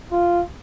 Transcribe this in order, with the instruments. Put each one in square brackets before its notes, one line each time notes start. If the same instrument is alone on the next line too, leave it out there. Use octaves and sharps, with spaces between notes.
[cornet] F4